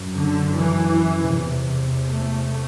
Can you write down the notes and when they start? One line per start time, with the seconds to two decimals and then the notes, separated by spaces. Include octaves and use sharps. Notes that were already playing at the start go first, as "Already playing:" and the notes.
Already playing: F#2
0.14 D3
0.53 E3
1.31 E2 C3
2.08 A3